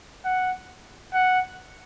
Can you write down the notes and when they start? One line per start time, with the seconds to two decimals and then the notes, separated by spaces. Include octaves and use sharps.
0.25 F#5
1.14 F#5